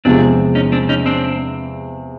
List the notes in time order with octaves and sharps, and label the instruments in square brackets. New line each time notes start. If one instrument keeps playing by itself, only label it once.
[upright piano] E2 C3 F3 G#3 [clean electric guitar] C4 D4
[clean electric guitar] C#4 D#4
C4 D4
C#4 D#4
C4 D4